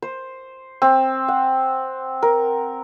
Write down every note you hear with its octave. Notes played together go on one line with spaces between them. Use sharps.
C5
C4
F#5
A#4